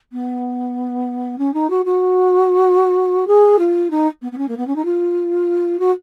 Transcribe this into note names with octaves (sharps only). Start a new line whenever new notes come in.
B3
C#4
D#4
F#4
F#4
G#4
F4
D#4
B3
B3
C#4
A#3
B3
C#4
D#4
F4
F#4